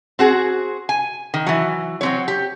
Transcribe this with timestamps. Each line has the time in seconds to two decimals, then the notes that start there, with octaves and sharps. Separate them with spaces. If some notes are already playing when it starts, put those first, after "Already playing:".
0.19 C4 F#4 G#4
0.89 G#5
1.34 D#3
1.46 E3 F#3
2.01 F#3 C4 C#5
2.28 G4